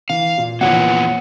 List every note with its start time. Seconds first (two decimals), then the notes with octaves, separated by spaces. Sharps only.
0.10 E3 F5
0.38 A#2
0.61 F2 A#2 E3 A#3 B3 C#5 F#5